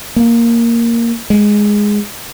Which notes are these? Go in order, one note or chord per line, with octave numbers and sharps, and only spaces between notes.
A#3
G#3